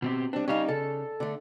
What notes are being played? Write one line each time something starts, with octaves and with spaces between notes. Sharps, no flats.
B2 C4 G4
G3 C4 D4
G3 C#4 D#4 F5
C#3 A4
D3 A3